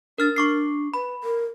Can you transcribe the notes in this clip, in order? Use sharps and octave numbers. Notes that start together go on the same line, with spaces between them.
D4 A#4 F6 A6
D4 C#6 D6 C7
B4 B5
A#4